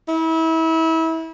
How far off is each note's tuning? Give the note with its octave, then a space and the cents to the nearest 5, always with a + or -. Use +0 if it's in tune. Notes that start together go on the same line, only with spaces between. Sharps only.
E4 -30